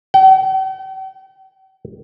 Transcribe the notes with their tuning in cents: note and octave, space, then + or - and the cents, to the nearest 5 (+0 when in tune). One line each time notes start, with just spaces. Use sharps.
G5 -45